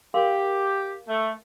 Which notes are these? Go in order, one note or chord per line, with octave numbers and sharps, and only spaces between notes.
G4 A#4 F5 C6
A3